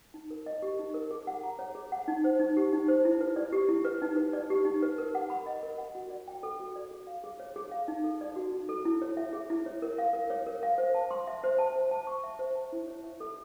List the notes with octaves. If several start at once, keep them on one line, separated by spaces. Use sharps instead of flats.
D#4
A#4
D#5
G4
D#4
A#4
G#4
F#5
A#5
C#5
G#4
F#5
D#4
C5
D#4
G4
D#4
C5
E4
B4
D5
G4
E4
B4
D#4
B4
D5
G4
D#4
B4
A#4
F#5
B5
D#5
A#4
F#5
F#4
D5
G5
A4
F#4
D5
G#4
F5
G#4
C#5
G#4
F5
D#4
A4
D5
F#4
D#4
A4
E4
C#5
E5
G#4
E4
C#5
A#4
F5
A#4
C#5
A#4
F5
C5
A5
C6
E5
C5
A5
C5
A5
C#6
E5
C5
A5
E4
C#5
E5
A4